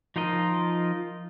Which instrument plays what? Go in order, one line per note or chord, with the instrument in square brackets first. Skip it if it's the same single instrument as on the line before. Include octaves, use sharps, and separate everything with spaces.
[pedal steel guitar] F3 D#4 F4 A#4 D#5